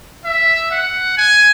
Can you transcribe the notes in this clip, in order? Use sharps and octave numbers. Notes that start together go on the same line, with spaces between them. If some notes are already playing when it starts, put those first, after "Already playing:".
E5
F#5
G#5